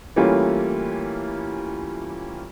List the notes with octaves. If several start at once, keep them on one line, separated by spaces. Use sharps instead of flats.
E3 G3 A3 A#3 C#4 F4